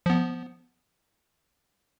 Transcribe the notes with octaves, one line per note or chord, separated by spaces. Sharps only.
F3 B3